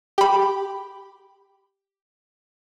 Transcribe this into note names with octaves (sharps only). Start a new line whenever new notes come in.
G4 B5